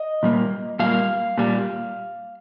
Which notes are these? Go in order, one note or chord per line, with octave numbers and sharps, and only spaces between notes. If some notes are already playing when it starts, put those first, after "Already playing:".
Already playing: D#5
A#2 G3 A#3
A#2 G3 A#3 F5
A#2 G3